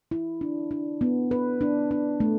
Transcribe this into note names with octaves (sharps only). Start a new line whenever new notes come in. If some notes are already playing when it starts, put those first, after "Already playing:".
E4
D4
D4
B3
B4
D4
D4
A3